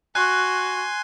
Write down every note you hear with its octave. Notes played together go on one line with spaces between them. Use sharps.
F#4 G#5 C6 F#6